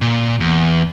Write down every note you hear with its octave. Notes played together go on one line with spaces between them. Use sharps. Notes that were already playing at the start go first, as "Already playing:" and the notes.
A#2
E2